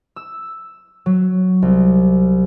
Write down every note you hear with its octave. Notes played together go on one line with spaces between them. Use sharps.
E6
F#3
C2